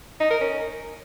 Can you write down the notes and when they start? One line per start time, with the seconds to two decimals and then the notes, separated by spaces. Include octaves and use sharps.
0.20 D#4
0.30 A#4
0.41 C#4